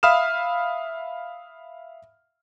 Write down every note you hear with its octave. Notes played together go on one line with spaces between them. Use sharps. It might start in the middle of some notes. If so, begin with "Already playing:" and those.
E5 F5 B5 D#6 F6 E7